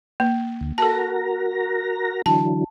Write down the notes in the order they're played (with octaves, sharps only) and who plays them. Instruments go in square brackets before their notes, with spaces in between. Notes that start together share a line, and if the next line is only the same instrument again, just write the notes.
[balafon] A#3
[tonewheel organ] D2
[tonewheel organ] F#4 A#4 A#5 [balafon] A4 A5
[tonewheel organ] D3 E3 F#3 [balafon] A5